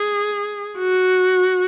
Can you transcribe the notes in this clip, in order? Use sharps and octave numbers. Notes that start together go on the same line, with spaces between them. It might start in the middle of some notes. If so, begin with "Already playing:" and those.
Already playing: G#4
F#4